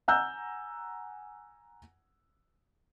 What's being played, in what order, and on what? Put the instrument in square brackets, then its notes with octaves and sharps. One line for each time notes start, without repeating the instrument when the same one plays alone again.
[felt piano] F#5 G#5 A#5 E6 F#6 G6